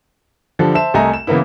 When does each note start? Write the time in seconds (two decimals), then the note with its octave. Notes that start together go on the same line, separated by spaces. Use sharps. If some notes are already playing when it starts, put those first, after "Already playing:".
0.59 D3 F3 G3 D4 A4
0.74 C5 E5 A5 E7
0.94 C2 A3 D#5 G#5 A#5
1.13 E7
1.27 C#3 E3 A#3 B3 E4